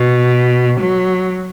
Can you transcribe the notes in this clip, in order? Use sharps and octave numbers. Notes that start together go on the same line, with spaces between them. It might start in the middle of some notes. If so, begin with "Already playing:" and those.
Already playing: B2
F#3